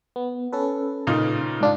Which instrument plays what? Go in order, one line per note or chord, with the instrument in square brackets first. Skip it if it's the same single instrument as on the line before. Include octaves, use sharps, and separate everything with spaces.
[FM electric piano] B3
C#4 A4 B4
[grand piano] A#2 C#3 D#4
[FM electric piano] G#2 D4 F4